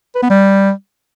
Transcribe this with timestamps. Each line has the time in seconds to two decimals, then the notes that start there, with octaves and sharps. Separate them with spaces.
0.15 B4
0.23 B3
0.30 G3